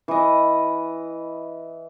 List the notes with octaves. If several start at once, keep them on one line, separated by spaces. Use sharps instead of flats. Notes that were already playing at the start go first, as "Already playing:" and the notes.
E3 D#5